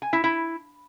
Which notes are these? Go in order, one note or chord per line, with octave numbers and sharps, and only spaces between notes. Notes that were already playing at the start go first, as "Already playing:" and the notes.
G#5
E4
E4